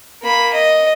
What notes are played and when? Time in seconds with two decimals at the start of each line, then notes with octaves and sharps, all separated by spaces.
0.23 A#3 B5
0.54 D#5